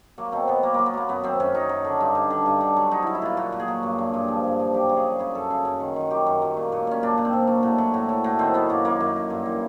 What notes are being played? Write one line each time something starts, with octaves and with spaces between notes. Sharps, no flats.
F#3 A#3
B2 C4
B2 B3
F#3 A#3
F#3 A#3
B3
F#3 A#3
F#2 B3
F#2 C4
F#2 C#4
F#3 D#4
F#2
D3
G2
G2
D3
G2
D3
F#3
F#3 D#4
F#3 E4
E4
A#2 F4
A#2 F#4
A#2
G#4
F#3
G2
G2
G2
F3
G2
F3
F#2 G4
C#3
G#4
F#3
C#3 G#4
F#2 A4
C#3 G#4
F#2
D#3
D#3 F#4
F#3 G4
F#2
F#3
A#2
A#2
A#2 C#4
A#2 D4
A#2
C4
A#2
F#3
A2
F#3
A2
F#3
A2
D#3 C4
F#3 B3
F#2 A#3
F#2 A#3
F#2
F#2
G2
E3